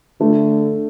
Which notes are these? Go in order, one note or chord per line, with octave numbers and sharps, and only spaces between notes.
D3 A3